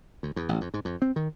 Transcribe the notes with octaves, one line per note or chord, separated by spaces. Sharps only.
D2
E2
A1
F2
G#2
F2
C4
D#3